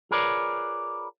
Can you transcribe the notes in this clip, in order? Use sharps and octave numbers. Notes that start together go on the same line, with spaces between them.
F4 G#4 A#4 B4 C#5 D5